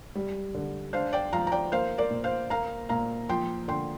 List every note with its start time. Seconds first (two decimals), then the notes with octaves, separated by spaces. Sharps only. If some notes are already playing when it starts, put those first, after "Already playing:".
0.15 G3
0.54 D3
0.93 D4 C5 F5
1.13 D5 G5
1.33 F3 F5 A#5
1.47 A#5
1.52 D5 G5
1.72 A#3 C5 F5
1.98 A#4 D5
2.11 A#2
2.24 C5 F5
2.50 A#3 F5 A#5
2.89 A#2 F5 A#5
3.29 F3 G5 C6
3.68 D3 G5 C6